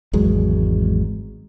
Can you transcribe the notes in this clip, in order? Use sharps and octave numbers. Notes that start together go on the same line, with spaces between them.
G#1 E2 F#3 G#3